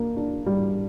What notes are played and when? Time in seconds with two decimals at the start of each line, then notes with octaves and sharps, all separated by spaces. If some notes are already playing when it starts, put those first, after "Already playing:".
Already playing: A#3 D4
0.16 D4
0.46 G3